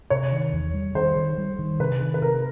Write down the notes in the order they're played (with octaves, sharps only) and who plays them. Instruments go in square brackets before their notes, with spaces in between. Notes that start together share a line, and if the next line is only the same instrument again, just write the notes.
[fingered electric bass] C3 [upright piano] C#5
[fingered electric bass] D#3
E2
G3
[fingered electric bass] D#3 [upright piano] C5
[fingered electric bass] D#3
G3
D#3
[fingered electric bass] C3 [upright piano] B4
[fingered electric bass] D#3
[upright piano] B4
[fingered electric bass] C3 [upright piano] A#4